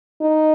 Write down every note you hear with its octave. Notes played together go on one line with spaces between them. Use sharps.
D#4